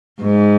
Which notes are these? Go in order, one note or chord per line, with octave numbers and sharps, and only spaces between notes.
G#2